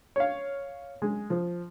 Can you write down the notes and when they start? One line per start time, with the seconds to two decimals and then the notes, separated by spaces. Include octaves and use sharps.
0.16 C#5 F5
1.02 G#3
1.30 F3